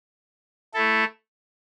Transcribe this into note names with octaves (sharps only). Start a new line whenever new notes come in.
A3 E4 A4